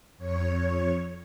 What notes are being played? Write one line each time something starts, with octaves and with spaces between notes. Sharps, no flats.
F2 C#5